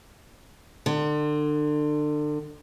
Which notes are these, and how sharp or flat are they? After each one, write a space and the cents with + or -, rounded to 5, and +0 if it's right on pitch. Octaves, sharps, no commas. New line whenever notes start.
D3 +30